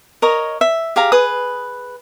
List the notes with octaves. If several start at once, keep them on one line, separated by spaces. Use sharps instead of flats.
A#4 C#5 D#5
E5
G4 G#4 F5 A#5
G#4 B4 D#6